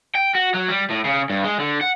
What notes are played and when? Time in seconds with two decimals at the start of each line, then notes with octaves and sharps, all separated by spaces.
0.15 G5
0.35 F#4
0.54 F#3
0.68 G3
0.90 A2
1.05 C#3
1.30 G2
1.44 G#3
1.60 D3
1.81 F#5